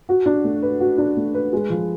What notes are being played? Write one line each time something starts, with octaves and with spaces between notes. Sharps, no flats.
F#4
D4
A3
B4
F#4
D4
A3
B4
G#3
F3